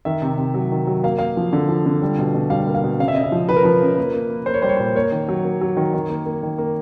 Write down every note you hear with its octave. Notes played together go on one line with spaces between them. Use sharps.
D#3 E5
C3
C3
F#3
D#3
F#3
A#3 F5
A#3 F5
F3
D3
F3
D3
G3
B2
B2
G3 F5
A#3
F5
B2
C#3 F5
E5
C#3 D#5
E5
F3
F3 B4
A#4
F3 B4
C#3
A#3
A#3
A#3
A#3 C5
C#5
G3 C5
C#5
A#2 C5
A#3 C#5
D#3
F#3
A#3
F#3
D#3
D#3
A#3
A#3
D#3
A#3